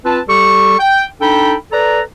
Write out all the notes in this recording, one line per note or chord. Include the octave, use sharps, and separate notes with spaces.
C4 F4 B4 A5
G3 G4 A4 C#6
G5
D4 D#4 A4 G5 B5
A4 B4 D5 A#5